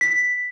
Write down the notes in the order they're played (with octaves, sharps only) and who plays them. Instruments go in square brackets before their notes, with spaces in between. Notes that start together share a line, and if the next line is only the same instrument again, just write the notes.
[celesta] B6